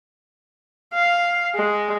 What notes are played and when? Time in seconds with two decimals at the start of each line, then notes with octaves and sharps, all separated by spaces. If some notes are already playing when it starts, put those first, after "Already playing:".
0.94 F5
1.55 G#3